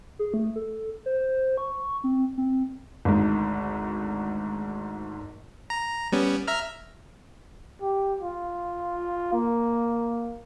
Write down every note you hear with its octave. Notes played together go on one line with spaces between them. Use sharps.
G#4
A3
A4
C5
C#6
C4
C4
G#1 D2 G#2
A#5
G3 B3 C#4
E5 A#5 F6
G4
F4
A#3